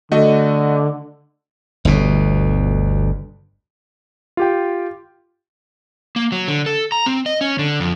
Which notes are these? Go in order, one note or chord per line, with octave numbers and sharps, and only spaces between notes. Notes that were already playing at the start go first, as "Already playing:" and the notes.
D3 A3 F#4 D#5
G1 D2 B2
F4 G4 G5
A#3
F#3
D3
A4
A#5
C4
D#5
C#4
D3
F2